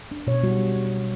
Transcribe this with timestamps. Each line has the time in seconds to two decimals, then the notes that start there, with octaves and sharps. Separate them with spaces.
0.11 D4
0.27 B2 C#5
0.43 G3 F#4